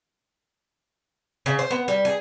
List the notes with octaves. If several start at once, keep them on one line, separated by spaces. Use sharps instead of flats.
C#3
C5
B3
G3
G#4